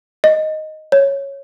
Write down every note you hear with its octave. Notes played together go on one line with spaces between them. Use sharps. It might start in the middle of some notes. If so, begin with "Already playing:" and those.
D#5
C#5